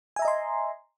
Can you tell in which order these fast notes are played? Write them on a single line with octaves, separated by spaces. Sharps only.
G#5 E5 A#5 D#5 C6